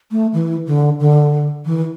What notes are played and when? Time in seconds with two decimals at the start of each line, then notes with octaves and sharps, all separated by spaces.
0.11 A3
0.33 E3
0.67 D3
1.00 D3
1.65 E3